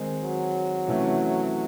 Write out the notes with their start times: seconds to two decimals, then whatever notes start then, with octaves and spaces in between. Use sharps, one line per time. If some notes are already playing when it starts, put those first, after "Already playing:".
Already playing: D#3 G#3 C4 D#4
0.23 F#3
0.88 C3 E3 A3 C#4